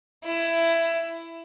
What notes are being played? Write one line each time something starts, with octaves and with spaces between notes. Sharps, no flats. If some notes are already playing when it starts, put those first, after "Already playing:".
E4